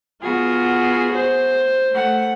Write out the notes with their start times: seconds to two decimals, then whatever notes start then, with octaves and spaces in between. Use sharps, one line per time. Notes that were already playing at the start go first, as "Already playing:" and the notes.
0.22 B3 F4 F#4 G#4
1.12 C5
1.90 A3 F#5